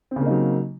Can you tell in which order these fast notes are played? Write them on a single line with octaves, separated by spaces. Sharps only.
C4 C#3 A#3 D#4 F#3